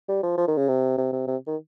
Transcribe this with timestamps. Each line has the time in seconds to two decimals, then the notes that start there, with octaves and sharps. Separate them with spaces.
0.08 G3
0.23 F3
0.38 F3
0.48 D#3
0.57 C#3
0.68 C3
0.98 C3
1.13 C3
1.27 C3
1.47 D#3